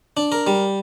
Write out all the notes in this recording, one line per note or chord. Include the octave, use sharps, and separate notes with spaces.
D4
A#4
G3